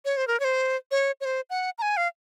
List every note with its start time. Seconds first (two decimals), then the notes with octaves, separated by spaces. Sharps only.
0.05 C#5
0.17 C5
0.27 A#4
0.40 C#5
0.44 C5
0.91 C#5
1.21 C#5
1.25 C5
1.50 F#5
1.78 A#5
1.82 G#5
1.97 F5